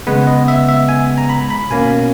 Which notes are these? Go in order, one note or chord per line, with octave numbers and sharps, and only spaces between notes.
C#3 G#3 B3 B4
D#5
E5
E5
G#5
A#5
B5
B5
B2 A#3 C#4 G#5